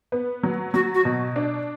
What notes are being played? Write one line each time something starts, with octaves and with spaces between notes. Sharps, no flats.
B3
F#3
F#3 F#4
F#4
B2
D4